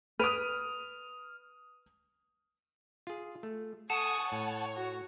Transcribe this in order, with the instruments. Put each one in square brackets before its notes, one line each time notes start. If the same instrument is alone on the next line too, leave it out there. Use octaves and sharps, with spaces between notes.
[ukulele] B4 [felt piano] D#6 D7 D#7 [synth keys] F6
[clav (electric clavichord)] F4 G#4
A3
[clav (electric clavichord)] A4 [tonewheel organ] F#5 A5 [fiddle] G#5 C#6 [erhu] D#6
[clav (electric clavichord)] A2 [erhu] C#5
[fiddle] F#4